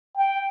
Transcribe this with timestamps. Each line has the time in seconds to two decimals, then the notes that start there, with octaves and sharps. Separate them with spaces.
0.17 G5